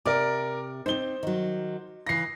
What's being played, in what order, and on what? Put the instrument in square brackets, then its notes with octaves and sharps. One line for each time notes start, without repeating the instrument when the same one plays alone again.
[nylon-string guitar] C3 [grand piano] A#4 D5 D6
[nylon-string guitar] C4 D4 D#4 [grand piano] C5 G7
[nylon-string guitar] D#3 F#3
[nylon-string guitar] C#3 E3 [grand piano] A#6 C7